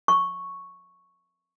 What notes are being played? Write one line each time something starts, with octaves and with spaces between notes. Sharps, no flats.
C#6